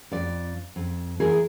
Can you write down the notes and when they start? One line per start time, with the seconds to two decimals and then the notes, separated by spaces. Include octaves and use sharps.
0.12 F2 D5
0.76 F2
1.20 E2 E3 G#4 A#4